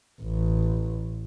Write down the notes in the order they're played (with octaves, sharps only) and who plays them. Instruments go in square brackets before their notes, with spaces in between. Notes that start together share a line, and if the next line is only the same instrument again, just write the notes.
[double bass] A1